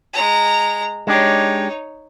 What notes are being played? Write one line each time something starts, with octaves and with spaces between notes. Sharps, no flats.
G#3 A#5
G#3 D4 D#4 G4 C#5